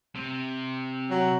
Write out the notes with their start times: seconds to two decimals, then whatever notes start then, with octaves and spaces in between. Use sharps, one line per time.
0.15 C3
1.10 F#3